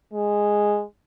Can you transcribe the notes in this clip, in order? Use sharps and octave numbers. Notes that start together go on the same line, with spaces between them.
G#3